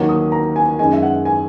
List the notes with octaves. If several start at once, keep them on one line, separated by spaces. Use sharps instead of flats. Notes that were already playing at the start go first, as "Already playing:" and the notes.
Already playing: D#2 D#3 F#3 A#3
D#6
A#5
G#5
F#2 D#3 G#3 D#4 G#5
E5
F#5
G#5